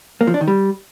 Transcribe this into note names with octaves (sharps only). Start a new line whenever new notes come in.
A#3
F3
D4
D#3
G3